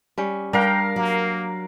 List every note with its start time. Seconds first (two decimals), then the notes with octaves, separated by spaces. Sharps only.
0.18 G3 C#4
0.53 G3 D4 A#4 F5 G5
0.96 F#3 A#3